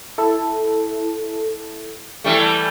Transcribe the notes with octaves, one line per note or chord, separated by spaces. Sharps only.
E4 A4
E3 G3 A3